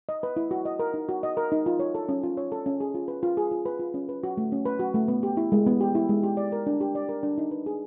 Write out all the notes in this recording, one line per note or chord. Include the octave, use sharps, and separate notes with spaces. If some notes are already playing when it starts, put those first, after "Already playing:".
D#5
B4
E4
F#4
D#5
A#4
D#4
F#4
D#5
A#4
D#4
F4
C#5
A4
C#4
F4
C#5
A4
C#4
G#4
F4
B4
F4
G#4
F4
B4
F4
C#4
B4
F#4
A3
C#4
B4
F#4
A3
B3
G4
E4
G#3
B3
G4
E4
G#3
G4
D5
A#4
D4
G4
D5
A#4
D4
D#4
B4
G#4